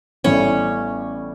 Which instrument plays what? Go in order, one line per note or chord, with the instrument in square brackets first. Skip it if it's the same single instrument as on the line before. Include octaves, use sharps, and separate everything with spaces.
[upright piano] A1 A2 E3 G3 B3 [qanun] C#4